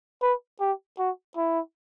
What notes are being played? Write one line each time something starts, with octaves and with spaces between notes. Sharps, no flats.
B4
G4
F#4
E4